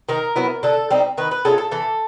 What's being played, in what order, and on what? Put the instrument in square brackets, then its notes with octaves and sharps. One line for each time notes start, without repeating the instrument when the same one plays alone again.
[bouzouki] D#3 A#4
F#3 B3 E4
D3 A4
G3 C4 D#4
D#3 B4
B4
G#3 C#4 F4 A4
A4
E3 A4